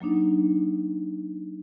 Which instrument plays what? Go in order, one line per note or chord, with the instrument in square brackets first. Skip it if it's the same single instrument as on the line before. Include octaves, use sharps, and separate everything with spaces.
[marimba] F#3 A#3 D4 D#4